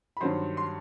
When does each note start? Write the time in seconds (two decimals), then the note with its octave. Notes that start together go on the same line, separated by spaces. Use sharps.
0.17 B5
0.21 G2 D#3 F#3 C5 C6
0.57 C6